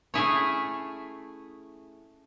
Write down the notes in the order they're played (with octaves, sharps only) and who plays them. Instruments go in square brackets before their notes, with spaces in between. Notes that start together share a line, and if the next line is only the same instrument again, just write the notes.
[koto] A3 C#4 E4 G#4 C#5